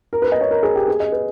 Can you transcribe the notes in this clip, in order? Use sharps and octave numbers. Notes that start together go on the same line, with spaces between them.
A#4
B4
D#5
C#5
A#4
G#4
G4
G#4
D#5
B4